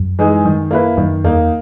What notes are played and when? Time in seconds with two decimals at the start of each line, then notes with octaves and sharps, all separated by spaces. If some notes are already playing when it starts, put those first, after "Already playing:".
Already playing: F#2
0.19 E3 G#3 D#4 G#4
0.45 D#3
0.71 A#3 E4 B4
0.97 F#2 D#3
1.24 E2 A#3 D#4